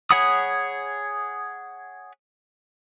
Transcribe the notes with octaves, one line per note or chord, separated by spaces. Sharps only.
G#4 C#5 F#5 B5 D#6